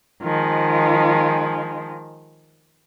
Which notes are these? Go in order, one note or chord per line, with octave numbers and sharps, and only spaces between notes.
D#3 F3 G#3